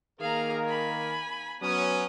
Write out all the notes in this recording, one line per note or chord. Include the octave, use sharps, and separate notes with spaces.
D#3 A#3 G#4 A#4 F5 A#5
G#5 B5
F#3 B3 C#4 D#6